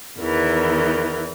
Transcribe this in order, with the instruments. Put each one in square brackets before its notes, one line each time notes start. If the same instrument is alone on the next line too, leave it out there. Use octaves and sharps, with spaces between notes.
[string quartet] E2 D#3 E3